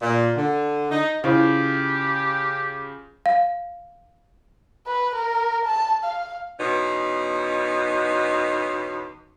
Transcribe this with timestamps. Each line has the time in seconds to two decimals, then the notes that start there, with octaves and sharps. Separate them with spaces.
0.01 A#2
0.37 D3
0.90 D#4
1.24 C#3 E4 F4 G4 C5 F5
3.26 F5
4.87 B4
5.15 A#4
5.65 A5
6.04 F5
6.60 E2 B2 C#4 D#4